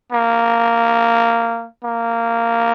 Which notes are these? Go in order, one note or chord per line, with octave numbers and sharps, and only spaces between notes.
A#3
A#3